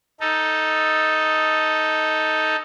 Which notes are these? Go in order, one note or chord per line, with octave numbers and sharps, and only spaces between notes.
D#4 A4